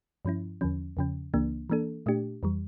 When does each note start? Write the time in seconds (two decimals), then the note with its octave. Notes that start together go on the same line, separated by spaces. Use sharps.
0.25 G2 F3 C#4 E4
0.61 E2 D3 F3 C#4
0.97 E2 C#3 F3 C#4
1.34 C#2 C#3 E3 A#3 D4
1.70 E3 A#3 D4 A4
2.06 A#2 A3 D4 G4
2.43 F2 E3 G3